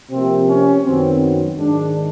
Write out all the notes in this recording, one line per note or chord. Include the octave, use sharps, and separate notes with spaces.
C3 F3 A#3 C4
C#4
F#2 D#3 F#3 B3 C4
G#2 D#3 G#3 D4